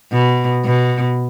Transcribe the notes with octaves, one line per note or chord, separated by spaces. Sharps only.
B2
B2